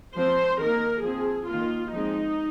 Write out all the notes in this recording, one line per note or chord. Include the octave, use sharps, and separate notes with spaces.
F3 C4 C5
D#3 A#3 A#4
F3 C4 G#4
D#3 A#3 F4
F3 G#3 C4 D#4